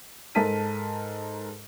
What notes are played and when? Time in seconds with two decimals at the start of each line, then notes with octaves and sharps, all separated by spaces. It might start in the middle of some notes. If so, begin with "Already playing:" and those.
0.35 G#2 A4 A#4 A5 B6 D#7